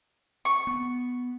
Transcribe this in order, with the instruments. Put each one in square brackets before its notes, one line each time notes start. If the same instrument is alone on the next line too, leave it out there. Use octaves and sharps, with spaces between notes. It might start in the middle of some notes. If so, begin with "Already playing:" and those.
[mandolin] C#6
[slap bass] B3